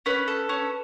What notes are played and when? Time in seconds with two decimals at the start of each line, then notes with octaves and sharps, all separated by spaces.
0.06 C#4 B4
0.28 A4
0.49 C#4